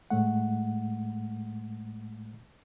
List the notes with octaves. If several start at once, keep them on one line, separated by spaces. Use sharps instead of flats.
A2 G#3 A3 F#5